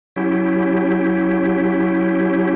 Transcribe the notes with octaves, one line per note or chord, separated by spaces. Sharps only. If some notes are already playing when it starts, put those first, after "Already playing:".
F#3 C#4 E4 G4